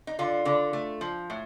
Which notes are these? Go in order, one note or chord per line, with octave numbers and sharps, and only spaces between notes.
D#4
D3 F4
D3
A3
F3
A2